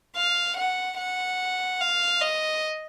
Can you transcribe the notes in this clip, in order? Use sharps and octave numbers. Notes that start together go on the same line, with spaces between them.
F5
F#5
F#5
F5
D#5